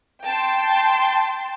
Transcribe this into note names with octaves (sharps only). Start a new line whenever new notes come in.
G5 A5 C6